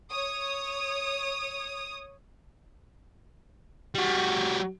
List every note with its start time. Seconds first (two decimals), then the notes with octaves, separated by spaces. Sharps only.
0.11 C#5 D#6
3.95 G3 F#4